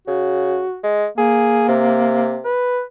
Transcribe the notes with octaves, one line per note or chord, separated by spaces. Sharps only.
C#3 F#4
G#3
A#3 G#4
C3
B4